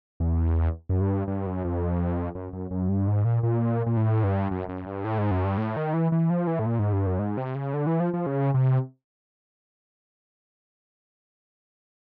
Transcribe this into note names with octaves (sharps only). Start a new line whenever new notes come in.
E2
F#2
G2
G2
F#2
F2
F#2
F#2
F#2
G2
G#2
A#2
A#2
A#2
A2
G2
F#2
F#2
G2
A2
G#2
F#2
G2
A2
D#3
E3
E3
F3
E3
A2
A#2
G#2
G2
F#2
G#2
C3
C#3
D3
E3
F3
F3
C#3
C3